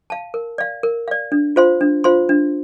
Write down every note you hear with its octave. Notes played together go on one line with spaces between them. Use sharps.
F5 A5
A#4
D5 F5
A#4
D5 F5
D4
F4 C5 F5 C6
D4
F4 C5 F5 C6
D4